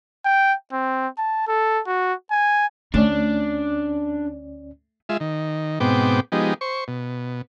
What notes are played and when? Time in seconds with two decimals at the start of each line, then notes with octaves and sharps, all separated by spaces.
0.25 G5
0.72 C4
1.18 A5
1.47 A4
1.86 F#4
2.31 G#5
2.94 D2 A3 C#4 D4 D5
5.09 G#3 F4 E5
5.20 D#3
5.80 G#2 B2 B3 C4 G5 D6
6.32 F3 G#3 B3 D#4 G4
6.61 C5 C#6
6.88 B2